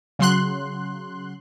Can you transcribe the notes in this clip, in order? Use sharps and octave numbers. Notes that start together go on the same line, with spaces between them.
C#3 F#3 C6 F#6